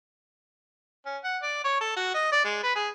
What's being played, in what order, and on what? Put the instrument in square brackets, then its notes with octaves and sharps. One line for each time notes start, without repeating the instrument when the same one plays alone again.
[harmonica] C#4
F#5
D5
C#5
A4
F#4
D#5
D5
G#3
B4
G#4